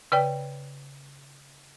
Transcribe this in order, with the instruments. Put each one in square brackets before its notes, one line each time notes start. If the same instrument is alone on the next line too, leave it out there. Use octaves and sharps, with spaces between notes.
[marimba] C#3 B4 D5 G5